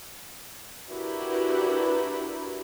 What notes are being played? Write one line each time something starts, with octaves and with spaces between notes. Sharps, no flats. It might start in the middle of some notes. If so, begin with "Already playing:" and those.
D4 E4 F#4 G4 A#4 B4